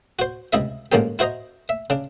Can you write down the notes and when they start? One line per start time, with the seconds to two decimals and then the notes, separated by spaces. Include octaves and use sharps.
0.19 F#4 C5
0.53 C#2 C3 E4 D#5 E5
0.92 G#2 D3 F3 A#3 C#4 G4
1.19 E4 F#4 C5 D#5 A#5
1.69 E5
1.90 C#3 D4